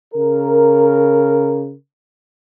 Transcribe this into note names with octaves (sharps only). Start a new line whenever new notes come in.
C#3 A#4